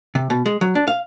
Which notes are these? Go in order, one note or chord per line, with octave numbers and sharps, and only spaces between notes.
C3
B2
G#3
F#3
D4
F5